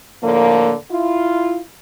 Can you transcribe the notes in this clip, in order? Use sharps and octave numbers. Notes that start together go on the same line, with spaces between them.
A2 D3 F3 A#3
E4 F4